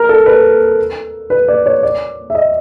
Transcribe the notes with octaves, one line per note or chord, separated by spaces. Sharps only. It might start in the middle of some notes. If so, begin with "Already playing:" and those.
Already playing: A#4
A4
B4
B4
D5
C#5
D5
E5
D#5